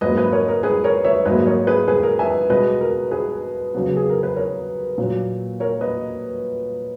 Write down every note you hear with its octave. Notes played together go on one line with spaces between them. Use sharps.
G#2 F#3 A#3 B4 D#5
B4 D#5
A#4 C#5
A#4
G#4 B4
A#4 C#5
C#5 E5
G#2 F#3 A#3 B4 D#5
A#4 C#5
G#4 B4
G#4 B4
A#4
E5 G#5
B2 G#3 B3 B4 D#5
A#4
G#4 B4
C#3 F#3 B3
G#4
A#4
B4
A#4 C#5
A#2 F#3 A#3
A#4 C#5
B4 D#5